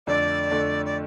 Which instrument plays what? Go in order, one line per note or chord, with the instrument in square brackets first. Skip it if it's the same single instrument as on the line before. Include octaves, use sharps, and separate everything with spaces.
[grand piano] F2 D3 A3 D4 [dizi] D5
[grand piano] F2 D3 A3 D4
[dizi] D5